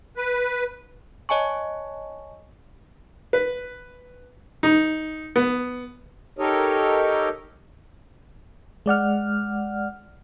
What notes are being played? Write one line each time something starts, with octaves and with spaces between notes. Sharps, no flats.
B4
C#5 D#5 G#5 A5 C#6
B4
D#4
B3
D#4 G4 A4 A#4 C#5 D#5
G#3 D5 F#5 F6